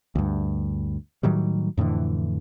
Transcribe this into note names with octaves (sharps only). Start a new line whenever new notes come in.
D2 G2
A2 D#3 F#3 G3
F2 A2 D3 E3